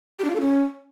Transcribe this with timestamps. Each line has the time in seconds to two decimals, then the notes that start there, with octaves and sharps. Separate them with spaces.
0.19 G4
0.24 D4
0.30 F4
0.35 A4
0.41 C#4